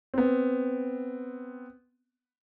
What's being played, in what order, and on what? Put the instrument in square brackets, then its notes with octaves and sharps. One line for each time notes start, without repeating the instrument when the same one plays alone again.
[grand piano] B3 C4